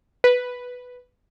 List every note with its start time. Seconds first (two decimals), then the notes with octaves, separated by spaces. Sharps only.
0.24 B4